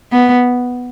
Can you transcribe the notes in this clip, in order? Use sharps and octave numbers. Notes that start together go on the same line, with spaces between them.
B3